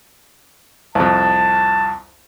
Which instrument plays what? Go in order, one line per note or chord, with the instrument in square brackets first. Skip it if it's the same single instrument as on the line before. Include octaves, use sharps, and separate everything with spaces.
[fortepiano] C2 F2 [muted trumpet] A5